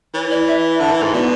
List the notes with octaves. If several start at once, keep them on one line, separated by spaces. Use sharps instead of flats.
E3 C#5
D5
E5
D3
E3
G#2
B2 D5